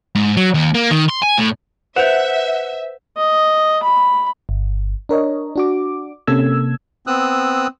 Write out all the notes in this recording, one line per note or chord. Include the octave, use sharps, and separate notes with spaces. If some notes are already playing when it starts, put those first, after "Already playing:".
G#2
F#3
D#2
A#3
D#3
C6
G#5
A2
B4 C5 E5 F#5 G6
D#5
B5
G1
D4 A#4 C#5 D#5
D4 F#4 D6
C3 A#3 C#4 A4 E6 G#6
B3 C4 D#6 E6 F#6